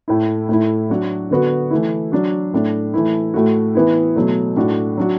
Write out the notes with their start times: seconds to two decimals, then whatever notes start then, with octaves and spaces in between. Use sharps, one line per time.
0.08 A2 A3 E4
0.49 A2 A3 E4
0.90 F#3 D4 F#4
1.31 D3 B3 F#4
1.71 E3 A3 E4
2.12 F#3 D4 F#4
2.53 A2 A3 D4
2.94 E3 A3 E4
3.34 A2 A3 F#4
3.75 E3 B3 E4
4.16 B2 F#3 A3
4.56 A2 A3 D4 F#4
4.97 F#3 D4 F#4